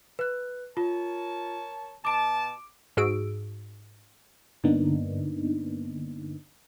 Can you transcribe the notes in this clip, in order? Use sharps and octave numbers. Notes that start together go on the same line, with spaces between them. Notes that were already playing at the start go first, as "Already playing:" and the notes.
B4 F#6
F4 A#4 C#5 A5
B2 A5 D6 D7
G#2 F#4 G#4 E6 D7
G2 D3 A#3 B3 D4 D#4